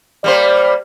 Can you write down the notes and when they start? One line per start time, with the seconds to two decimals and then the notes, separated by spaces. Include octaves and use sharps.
0.24 G3 A#3 C5 D5